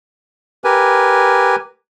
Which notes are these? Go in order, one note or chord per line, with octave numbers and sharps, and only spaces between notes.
G4 A#4 B4 G#5